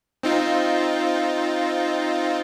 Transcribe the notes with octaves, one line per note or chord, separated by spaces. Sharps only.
C4 D#4 F4